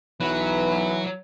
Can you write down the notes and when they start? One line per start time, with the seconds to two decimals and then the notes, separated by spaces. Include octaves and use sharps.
0.20 B1 E3 F#3 B4